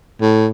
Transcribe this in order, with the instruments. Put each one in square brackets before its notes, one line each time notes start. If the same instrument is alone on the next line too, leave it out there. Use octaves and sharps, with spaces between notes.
[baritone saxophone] A2